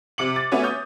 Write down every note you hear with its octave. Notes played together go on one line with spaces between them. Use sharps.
C3 D6 C#7 F#7
A6
A3 B3 C#4 F#4 B4 C#5
D#6 G6